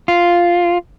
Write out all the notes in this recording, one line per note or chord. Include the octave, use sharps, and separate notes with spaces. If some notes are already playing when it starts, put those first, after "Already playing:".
F4